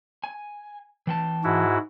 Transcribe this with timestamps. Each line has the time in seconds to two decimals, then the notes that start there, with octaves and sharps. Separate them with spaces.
0.24 G#5
1.07 E3 G5 A5
1.44 G#2 E4 F#4